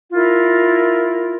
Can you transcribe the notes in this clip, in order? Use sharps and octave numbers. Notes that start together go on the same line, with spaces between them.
E4 F4 A#4